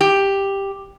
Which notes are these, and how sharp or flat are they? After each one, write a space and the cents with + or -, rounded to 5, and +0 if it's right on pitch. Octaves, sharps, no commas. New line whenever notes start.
G4 +5